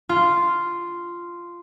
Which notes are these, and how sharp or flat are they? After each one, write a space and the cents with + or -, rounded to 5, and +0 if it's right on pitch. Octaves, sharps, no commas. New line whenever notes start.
F4 -10